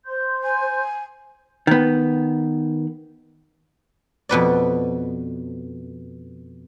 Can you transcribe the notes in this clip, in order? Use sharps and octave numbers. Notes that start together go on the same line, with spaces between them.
C5 C6 G6
G#5
D#3 B3
F2 B2 B4 D5